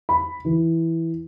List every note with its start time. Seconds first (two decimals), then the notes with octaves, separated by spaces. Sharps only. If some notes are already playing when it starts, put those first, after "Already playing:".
0.09 B5
0.45 E3